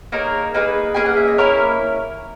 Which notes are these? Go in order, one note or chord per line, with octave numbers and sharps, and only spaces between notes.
A#3 D#4 G#4 A#4 C#5
A#3 D#4 G#4 B4
A#3 C#4 G#4 G#5
F#5
E5
D#5
A#3 C#4 E4 A#4 C#5